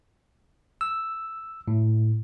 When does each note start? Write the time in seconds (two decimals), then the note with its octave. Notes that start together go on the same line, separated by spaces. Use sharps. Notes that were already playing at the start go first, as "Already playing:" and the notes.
0.81 E6
1.68 A2